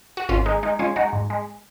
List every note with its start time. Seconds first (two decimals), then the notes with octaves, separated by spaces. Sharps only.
0.17 F#4
0.29 G#1 C#4 F4
0.46 G#3 D#4
0.63 G#3 D#4
0.79 G#3 C#4 F4
0.96 G#3 D#4 F#4
1.13 G#2
1.30 G#3